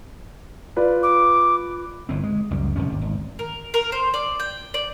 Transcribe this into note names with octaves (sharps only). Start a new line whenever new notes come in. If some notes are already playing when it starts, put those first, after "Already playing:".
F4 B4 D5
D6
G1 E3 C4
G#3
C#2 F#2 G3
C2 F2 C3 C#4
G1 D#2
G#1
A#4
A#4
C5
D5
G5
D5